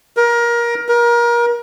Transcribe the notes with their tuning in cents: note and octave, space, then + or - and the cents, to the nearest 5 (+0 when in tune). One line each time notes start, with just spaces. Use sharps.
A#4 +25
A#4 +30